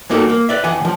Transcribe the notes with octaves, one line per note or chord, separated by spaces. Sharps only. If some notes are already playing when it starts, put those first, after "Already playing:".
E2 G2 A#3 D#4 F#4 A4
A#3
B4 D5 E5
F2 E3 F#5 G#5
C#2 F3